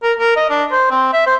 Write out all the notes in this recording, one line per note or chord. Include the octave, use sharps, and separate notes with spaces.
A#4
A#4
D#5
D4
C5
C4
E5
C5